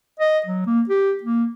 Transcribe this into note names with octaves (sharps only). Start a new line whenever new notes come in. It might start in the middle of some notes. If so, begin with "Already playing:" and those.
D#5
F#3
A#3
G4
A#3